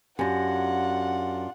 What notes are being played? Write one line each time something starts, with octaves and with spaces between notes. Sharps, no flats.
F#2 D4 F4 G4 F#5 A#6